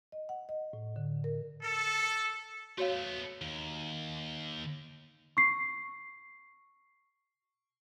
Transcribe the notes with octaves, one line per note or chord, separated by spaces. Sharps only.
D#5
F#5
D#5
A2
D3
A#4
A4
A3 B3 F#4 C#5 F5
D#2
C#6 C7